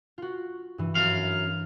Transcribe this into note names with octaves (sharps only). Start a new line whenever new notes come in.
F4 F#4
G2 E3
F#2 F5